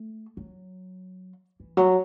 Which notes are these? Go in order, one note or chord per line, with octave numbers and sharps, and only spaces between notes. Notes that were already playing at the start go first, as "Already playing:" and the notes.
Already playing: A3
F#3
E3
F#3